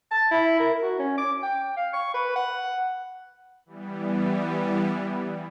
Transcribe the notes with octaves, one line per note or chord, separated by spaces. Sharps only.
A5
E4
A#4
F#4
C#4
D6
G5
F5
C#6
B4
F#5
E3 G3 B3